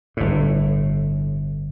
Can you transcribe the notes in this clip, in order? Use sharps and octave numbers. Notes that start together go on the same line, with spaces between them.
G1 A2